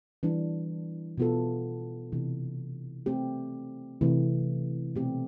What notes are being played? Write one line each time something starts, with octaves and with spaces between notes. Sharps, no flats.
E3 G3 D4
B2 B3 F4 A4
C3 E3 A3 D4
A3 C4 G4
C3 E3 A3
B2 A3 C4 G4